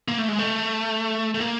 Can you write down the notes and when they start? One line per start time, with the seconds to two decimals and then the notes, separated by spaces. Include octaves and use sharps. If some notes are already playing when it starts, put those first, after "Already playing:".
0.08 A#3
0.18 A3
0.29 G#3
0.39 A3
1.34 A3
1.41 A#3